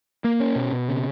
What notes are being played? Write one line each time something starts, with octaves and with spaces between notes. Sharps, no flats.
A#3
C#4
B2
B2
C#3